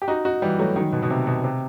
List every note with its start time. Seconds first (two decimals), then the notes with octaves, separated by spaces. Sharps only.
0.02 G4
0.08 D#4 F#4
0.25 D#4 F#4
0.42 E3 G3
0.59 F#3 A3
0.76 D#3 F#3
0.92 B2
1.02 B2
1.10 C3
1.27 B2
1.44 C3